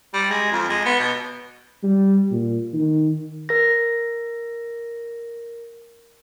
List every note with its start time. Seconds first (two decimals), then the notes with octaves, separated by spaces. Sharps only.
0.14 G3
0.30 G#3
0.51 F2
0.69 G#3
0.85 B3
0.99 B2
1.83 G3
2.31 A#2
2.73 D#3
3.49 A#4 A#6